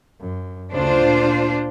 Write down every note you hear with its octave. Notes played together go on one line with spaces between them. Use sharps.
F#2
D2 C#3 D4 F4 C5
A#2